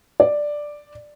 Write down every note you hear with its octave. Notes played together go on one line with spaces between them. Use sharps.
D5